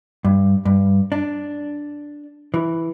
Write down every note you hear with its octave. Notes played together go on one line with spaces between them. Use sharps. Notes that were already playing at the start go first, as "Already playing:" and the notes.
G2
G2
D4
E3